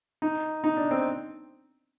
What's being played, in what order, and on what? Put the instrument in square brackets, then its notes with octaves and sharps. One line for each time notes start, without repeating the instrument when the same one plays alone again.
[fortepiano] D#4
D#4
D4
C4